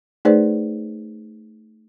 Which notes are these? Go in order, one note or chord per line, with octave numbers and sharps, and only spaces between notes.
A3 D#4 G#4 B4 C5 D5